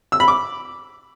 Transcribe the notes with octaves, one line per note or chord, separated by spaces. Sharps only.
E6
B5
D6